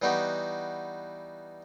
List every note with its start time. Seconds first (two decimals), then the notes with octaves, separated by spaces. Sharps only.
0.02 E3 G3 B3 D#4 F#4 G4